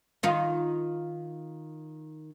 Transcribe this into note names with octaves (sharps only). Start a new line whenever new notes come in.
D#3 D#4 F4